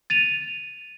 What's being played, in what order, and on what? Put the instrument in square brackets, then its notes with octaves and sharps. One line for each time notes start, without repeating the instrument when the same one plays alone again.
[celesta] A6 D#7 F7